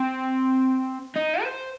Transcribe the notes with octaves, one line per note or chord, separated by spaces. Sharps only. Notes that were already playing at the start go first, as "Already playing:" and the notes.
Already playing: C4
D#4
C5